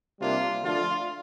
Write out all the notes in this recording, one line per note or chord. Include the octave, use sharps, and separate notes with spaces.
C3 G3 A#3 D4 F4
D3 F3 A3 D4 F4